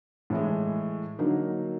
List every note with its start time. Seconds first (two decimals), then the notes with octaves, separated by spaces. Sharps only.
0.30 A2 E3 G#3
1.19 D3 F#3 A#3 D#4